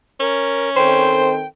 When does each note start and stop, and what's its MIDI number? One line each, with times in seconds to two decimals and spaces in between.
0.20 1.38 61
0.20 0.70 70
0.77 1.43 51
0.77 1.43 60
0.77 1.43 69
0.77 1.33 72
0.77 1.47 79